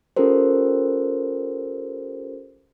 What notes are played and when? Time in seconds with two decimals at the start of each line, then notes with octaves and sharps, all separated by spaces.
0.17 C#4 F4 G4 A4 A#4 C5